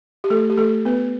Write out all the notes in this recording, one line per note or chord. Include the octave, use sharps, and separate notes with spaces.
G4
A3 A4
G4
A3 A4
B3 B4